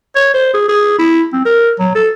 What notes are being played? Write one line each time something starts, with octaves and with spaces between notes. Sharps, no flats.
C#5
C5
G#4
G#4
E4
C4
A#4
F#3
A4